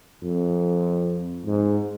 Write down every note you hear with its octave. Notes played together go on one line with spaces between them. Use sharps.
F2
G#2